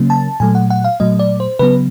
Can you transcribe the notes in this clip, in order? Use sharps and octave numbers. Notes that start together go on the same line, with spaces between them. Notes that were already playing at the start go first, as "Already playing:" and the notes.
Already playing: C#3 F#3 A#3 C#4
A5
A#2 F#3 A3 G#5
F#5
F#5
F5
A#2 F#3 A3 D#5
D5
C5
C#3 F#3 B3 B4